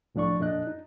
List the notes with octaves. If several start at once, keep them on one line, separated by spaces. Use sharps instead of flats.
C2 A2 F3 D4 D5 C#6
F2 A#2 D4 D#5 F#6
D#4